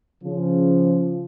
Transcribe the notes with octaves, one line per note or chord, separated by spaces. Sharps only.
C#3 F3